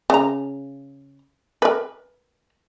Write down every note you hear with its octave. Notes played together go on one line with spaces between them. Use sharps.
C#3 A#5
A#4 B4